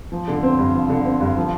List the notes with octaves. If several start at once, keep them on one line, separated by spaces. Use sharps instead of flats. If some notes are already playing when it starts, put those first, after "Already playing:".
F3
D3
C4
G2
F3
D3
C4
G2
F3